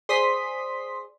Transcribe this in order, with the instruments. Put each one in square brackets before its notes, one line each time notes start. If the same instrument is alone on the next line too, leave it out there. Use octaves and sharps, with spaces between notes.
[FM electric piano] G#4 C5 D5 [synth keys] C6 D#6 B6